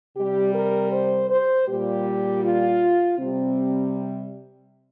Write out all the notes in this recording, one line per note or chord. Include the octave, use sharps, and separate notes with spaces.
C3 G3 G4
A#4
C5
C5
A#2 G3 G4
F4
C3 G3 C4